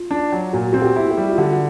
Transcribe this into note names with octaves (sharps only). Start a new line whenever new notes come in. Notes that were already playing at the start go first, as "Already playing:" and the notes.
Already playing: F4
D4
F#3
A#2 F#4
C4 F#4
G4
E4
G4
G3
F4
D3 F#4